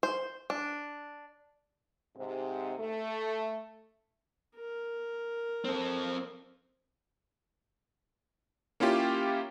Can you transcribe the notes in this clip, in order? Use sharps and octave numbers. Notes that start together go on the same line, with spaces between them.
C5
D4
G#2 C3
A3
A#4
C4 A4
A#3 C#4 E4 F4 G4